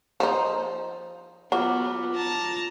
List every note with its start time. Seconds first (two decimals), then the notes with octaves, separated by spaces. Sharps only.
0.20 F3 D#4
1.52 F#3 B3 F4 D6
2.16 A5 A#5